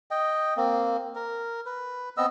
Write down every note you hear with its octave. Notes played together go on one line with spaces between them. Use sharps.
D#5 G5
A#3 C4
A#4
B4
B3 C4 D#5 E6